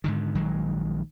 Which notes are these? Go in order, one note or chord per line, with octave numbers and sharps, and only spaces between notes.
G#2 D3 D#3
A#1 D#3 F#3 G#3